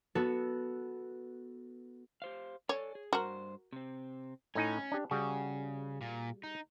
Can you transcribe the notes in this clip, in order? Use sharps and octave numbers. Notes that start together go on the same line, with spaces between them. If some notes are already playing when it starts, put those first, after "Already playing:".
B3 F#4 A4
G4 C5 F5
A4 C#5 D5 G#5
G#4
G2 F#4 A#4 C5
C3 C4
A2 C#4 D#4 G#5
D4 G4
C#3 G3 F#4 G#4
A#2
D#4